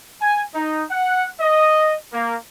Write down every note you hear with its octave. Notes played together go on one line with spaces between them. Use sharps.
G#5
D#4
F#5
D#5
A#3